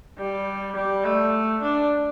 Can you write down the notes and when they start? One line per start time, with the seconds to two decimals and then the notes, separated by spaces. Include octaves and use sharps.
0.18 G3
0.76 G3
1.05 A3
1.62 D4